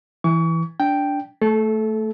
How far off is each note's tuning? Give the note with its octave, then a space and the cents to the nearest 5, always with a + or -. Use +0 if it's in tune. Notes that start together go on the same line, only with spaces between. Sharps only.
E3 +0 C#6 +35
D4 -15 G5 +0
A3 +5 A4 -25